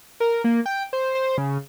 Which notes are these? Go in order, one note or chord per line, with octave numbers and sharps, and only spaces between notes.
A#4
A#3
G5
C5
C5
C#3